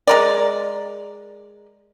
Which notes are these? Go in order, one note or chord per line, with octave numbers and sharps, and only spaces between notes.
G#3 A#4 D5